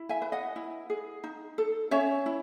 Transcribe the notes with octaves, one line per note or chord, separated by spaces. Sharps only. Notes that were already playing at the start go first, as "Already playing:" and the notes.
Already playing: E4
E5 G#5
B4
D#5 F#5
E4
G#4
D#4
A4
C#4 C#5 E5
E4